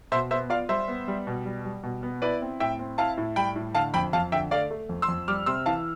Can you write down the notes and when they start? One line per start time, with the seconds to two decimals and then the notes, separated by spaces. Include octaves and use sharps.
0.12 B2 C5 E5
0.31 B3 C5 E5
0.50 F4 D5 F5
0.69 G3 C5 E5
0.88 B3
1.08 G3
1.27 B2
1.45 G3
1.65 G3
1.83 B2
2.03 B3
2.22 E4 B4 D5
2.42 C4
2.60 A2 E5 G5
2.79 C4
2.98 E4 F5 A5
3.18 A2
3.36 G3 G5 B5
3.56 A2
3.75 D3 F5 A5
3.94 F2 G5 B5
4.13 F2 F5 A5
4.32 D3 E5 G5
4.51 A3 D5 F5
4.71 A3
4.89 F2
5.02 C6 E6
5.08 F2
5.28 G3 D6 F6
5.46 C3 C6 E6
5.66 E3 F5 A5